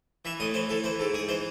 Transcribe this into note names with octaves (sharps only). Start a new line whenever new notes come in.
E3 E5
A2 D#5
E3 C5
E3 A4
E3 C5
G#2 A4
G#2 G#4
E3 C5